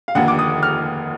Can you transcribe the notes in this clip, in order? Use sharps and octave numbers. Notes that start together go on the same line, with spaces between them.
F5
F1 D#2 D3 F#5
D6
D#6
F6